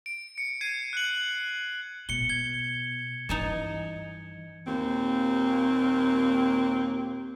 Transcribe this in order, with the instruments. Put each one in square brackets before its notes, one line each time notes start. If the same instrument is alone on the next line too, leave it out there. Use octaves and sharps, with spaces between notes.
[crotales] D7
C#7
G#6 C7 D#7
F#6 C#7 F#7
[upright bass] B2 [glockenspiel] C#7 G7
[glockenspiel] G#6 G7
[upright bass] G2 E3 [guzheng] D#4 G#5 A5
[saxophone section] D#2 A#2 C4